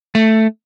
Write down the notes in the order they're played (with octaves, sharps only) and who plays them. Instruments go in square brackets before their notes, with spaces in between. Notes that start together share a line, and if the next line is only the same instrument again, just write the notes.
[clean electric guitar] A3